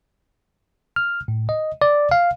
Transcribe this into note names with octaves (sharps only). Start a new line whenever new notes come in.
F6
A2
D#5
D5
F5